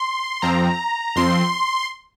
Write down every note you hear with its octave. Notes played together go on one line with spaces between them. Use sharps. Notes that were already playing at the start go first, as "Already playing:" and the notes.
Already playing: C6
F2 F3 C4 A#5
F2 F3 C4 C6